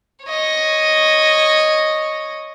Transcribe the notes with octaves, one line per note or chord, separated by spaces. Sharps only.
C#5 D#5